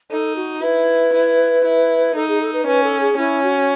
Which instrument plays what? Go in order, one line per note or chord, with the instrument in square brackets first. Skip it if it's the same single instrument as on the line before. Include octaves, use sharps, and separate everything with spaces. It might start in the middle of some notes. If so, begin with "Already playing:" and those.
[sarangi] D#4 [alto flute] A4
[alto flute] F#4
[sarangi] E4 [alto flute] B4
[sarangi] E4
E4
[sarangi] D#4 [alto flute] A4
[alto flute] G#4
A4
B4
[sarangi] C#4 [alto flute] B4
[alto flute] A4
G#4
[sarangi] C#4 [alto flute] E4
[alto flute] F#4